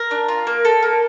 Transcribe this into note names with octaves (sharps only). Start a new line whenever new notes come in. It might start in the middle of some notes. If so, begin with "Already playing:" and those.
Already playing: A#4
D4
F4
A#3
A4
A#3